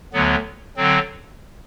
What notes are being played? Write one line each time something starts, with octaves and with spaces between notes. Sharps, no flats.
D2 D3 F#3 B3
D3 F#3 C4